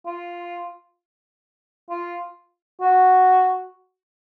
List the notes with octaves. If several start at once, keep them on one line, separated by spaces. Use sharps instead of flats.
F4
F4
F#4